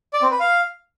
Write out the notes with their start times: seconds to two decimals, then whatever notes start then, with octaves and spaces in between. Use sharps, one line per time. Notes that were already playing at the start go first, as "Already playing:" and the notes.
0.13 D5
0.22 C4
0.31 B4
0.40 F5